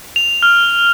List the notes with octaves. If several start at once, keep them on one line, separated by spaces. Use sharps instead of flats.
F7
F6